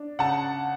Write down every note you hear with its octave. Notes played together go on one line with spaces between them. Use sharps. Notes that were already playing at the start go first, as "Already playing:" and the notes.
Already playing: D4
C#3 F#5 A5